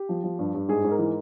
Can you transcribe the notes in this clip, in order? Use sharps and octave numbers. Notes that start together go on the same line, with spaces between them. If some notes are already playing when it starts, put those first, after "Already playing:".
Already playing: G4
F3
F3
G2
G2
G#2 G#4
G#2
A#4
E3